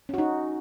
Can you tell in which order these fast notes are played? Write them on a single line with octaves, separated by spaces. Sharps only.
C#4 F#4 D#4